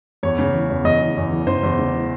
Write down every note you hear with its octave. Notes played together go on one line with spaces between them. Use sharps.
E2 C#5
C#3
E3
E2
E2 D#5
E3
E2
E3
C#3 C5
E2
C#3
E3